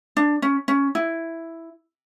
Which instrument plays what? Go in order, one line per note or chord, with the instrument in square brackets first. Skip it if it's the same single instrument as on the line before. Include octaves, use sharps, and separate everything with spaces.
[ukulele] D4
C#4
C#4
E4